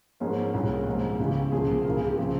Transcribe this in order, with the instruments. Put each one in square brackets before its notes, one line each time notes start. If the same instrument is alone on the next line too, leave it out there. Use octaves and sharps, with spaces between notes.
[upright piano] G#2 F3 A#3 C#4 G#4
C2 A#2 G3 C#4 G#4
G#2 F3 G#3
C#2 C#3 E3 G4
C2 A#2 F3 G#4
C#2 C#3 E3 A#4
G#4
G4
C#3 F3 C4 G#4